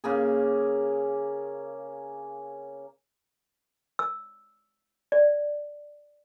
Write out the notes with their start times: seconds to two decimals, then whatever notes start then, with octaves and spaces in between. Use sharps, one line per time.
0.04 C#3 A#3 G#4
3.99 E6
5.12 D5